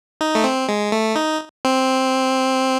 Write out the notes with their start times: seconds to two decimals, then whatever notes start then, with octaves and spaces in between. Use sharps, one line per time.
0.21 D#4
0.35 A3
0.44 C4
0.69 G#3
0.92 A3
1.16 D#4
1.65 C4